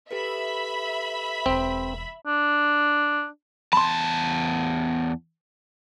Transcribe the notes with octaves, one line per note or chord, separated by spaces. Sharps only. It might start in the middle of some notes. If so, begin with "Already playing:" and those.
G4 A4 B4 E5 B5
E1 E3 C4
D4
E2 A5 B5 C6